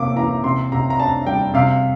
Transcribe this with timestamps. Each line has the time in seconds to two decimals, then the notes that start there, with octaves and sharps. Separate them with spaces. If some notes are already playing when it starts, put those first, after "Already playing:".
Already playing: C3 A#3 D6
0.16 E3 A#5
0.43 C3 C6
0.72 C3 A#5
0.90 A#5
0.99 D4 A5
1.26 G3 G5
1.54 C3 F5